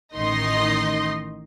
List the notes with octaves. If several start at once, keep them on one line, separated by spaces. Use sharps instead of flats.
A1 D#3 D#4 D#5 C6